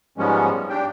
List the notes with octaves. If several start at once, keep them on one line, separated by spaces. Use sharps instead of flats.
G#2 F3 G3 G#3 B3 C#4
D4 G4 G5